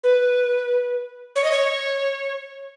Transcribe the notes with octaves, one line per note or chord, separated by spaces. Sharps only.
B4
C#5
D#5
C#5